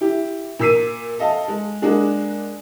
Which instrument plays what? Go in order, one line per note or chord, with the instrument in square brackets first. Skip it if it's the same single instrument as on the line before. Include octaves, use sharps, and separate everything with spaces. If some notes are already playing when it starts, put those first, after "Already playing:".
[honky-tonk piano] E4 G4
A#2 A#3 E6 B6 C7 D#7
A4 D#5 F5 A5
G#3
G#3 A#3 D4 F#4 G#4